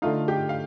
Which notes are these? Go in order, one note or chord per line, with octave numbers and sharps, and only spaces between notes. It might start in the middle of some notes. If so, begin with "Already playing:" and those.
D3 A3 D#4 F4 F5
G4 G5
F5